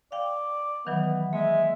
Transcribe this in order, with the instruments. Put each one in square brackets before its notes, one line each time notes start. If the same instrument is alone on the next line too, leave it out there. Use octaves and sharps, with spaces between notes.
[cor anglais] D5 [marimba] F5 G5
[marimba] D#3 E3 F#3 [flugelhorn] B3
[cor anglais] G#3 [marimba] A#3 [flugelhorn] E5